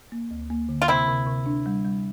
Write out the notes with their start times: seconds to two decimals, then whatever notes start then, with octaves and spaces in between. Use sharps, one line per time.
0.12 A#3
0.31 D2
0.50 A#3
0.69 D3
0.82 F4
0.88 C3 C4 E4
1.08 C3
1.26 C3
1.46 D4
1.66 G3
1.85 G3